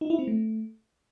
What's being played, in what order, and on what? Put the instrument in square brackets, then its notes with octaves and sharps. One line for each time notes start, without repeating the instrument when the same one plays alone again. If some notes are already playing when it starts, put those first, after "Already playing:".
[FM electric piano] D#4
E4
C4
A3